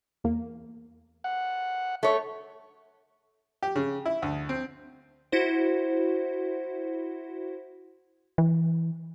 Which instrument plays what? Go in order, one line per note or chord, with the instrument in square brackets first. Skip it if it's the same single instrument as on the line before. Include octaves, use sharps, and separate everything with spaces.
[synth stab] E2 A#3
[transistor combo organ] F#5
[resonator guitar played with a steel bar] A3 C#5
[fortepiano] G4
C#3
E4
D2
C4
[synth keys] E4 F#4 C5
[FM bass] E3